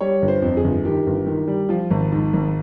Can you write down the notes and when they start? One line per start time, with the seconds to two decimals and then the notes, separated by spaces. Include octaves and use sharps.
0.01 G3 C#5
0.22 G1
0.28 C5
0.42 F2
0.57 G#4
0.64 G1
0.85 D#3 G4
1.07 G1
1.27 D#3
1.48 G3
1.69 F3 F4
1.91 G#1
2.12 G#2
2.33 G#1